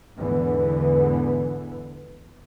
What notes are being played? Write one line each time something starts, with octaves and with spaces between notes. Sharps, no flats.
E2 G#2 D3 E3 B3